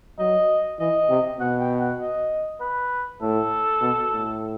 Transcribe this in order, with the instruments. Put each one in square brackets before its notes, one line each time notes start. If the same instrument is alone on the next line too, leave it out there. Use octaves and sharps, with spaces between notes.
[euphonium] F#3 [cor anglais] D#5
[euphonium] E3 [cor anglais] D#5
[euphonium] C3
[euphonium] B2 [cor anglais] F#5
[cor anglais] G5
F#5
D#5
B4
[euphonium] A2 [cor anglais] A4
[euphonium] B2
A2